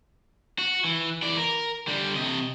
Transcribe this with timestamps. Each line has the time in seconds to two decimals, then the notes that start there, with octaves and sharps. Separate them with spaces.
0.59 F#4
0.85 E3
1.22 E3 D5
1.37 A#4
1.87 D3 G3
2.16 C3 D#5